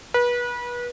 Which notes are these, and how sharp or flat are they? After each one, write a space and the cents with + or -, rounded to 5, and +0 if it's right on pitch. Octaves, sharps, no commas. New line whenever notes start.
B4 -30